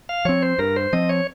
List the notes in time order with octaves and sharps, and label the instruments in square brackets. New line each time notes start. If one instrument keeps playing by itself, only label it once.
[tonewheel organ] F5
[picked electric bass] F3 C4 [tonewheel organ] C#5
[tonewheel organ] C5
[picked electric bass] G2 [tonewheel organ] A#4
[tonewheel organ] C5
[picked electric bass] F3 C4 [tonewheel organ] D#5
[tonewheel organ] C#5